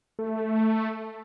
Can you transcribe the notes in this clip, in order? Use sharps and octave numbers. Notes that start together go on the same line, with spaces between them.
A3